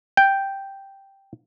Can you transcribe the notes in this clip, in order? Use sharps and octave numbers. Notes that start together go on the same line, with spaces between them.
G5